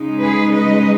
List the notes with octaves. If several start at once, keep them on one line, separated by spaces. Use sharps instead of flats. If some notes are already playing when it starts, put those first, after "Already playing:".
Already playing: C#3 G#3 D#4
G#4 B4
B4 D#5